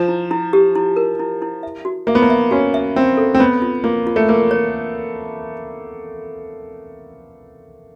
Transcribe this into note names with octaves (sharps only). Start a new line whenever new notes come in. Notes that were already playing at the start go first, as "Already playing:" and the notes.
Already playing: F3
E4
E4
G4
E4
A#4
E4
E4
E5
F#4
A#3 E5
B3
A#3
E5
C#4 F#4
E5
C4 E5
A4
C4
B3 C#5
F4
A#3 F4
F4
A3
A#3 A#4
C#5